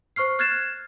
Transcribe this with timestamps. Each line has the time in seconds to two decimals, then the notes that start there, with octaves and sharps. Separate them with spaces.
0.16 C5 C#6 F6 C7
0.39 F6 F#6 G#6 A6 C7 E7